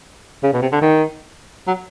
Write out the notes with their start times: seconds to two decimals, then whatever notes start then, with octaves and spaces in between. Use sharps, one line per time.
0.43 C#3
0.53 B2
0.62 C3
0.72 D3
0.81 D#3
1.67 F#3